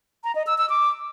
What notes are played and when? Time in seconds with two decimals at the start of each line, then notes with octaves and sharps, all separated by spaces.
0.24 A#5
0.35 D#5
0.47 E6
0.58 E6
0.69 D6